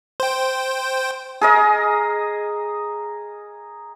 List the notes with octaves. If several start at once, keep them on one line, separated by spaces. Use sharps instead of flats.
C5 G5
G#4 A#4 D#5